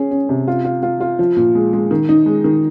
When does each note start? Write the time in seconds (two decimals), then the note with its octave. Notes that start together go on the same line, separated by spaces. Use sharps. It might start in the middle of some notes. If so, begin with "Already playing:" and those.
Already playing: C#4 G#4
0.11 C#4
0.29 C3
0.48 F4
0.65 F4
0.83 F4
1.00 F4
1.19 F3
1.36 A#2
1.55 G#3
1.73 G#3
1.91 D#3
2.09 D#4
2.26 G#3
2.44 D#3